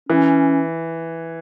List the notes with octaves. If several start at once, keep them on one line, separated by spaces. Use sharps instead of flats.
E3 C#4